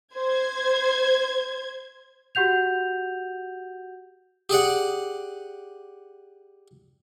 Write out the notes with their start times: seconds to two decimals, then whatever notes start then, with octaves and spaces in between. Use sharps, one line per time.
0.16 C5 G#6
2.35 F#4 G4 F#5 G6 F7
4.49 G4 G#4 D5 F#5